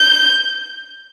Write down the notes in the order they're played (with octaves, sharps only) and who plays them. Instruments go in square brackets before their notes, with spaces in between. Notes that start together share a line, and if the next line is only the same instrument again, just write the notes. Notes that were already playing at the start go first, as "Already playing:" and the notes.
Already playing: [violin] G6